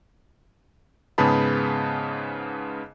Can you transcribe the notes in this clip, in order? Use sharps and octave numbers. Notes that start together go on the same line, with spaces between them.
G#2 C#3 B3 G#4 A5 B5